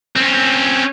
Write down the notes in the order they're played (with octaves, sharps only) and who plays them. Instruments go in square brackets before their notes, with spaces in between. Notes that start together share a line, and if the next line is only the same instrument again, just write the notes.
[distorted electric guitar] C4 C#4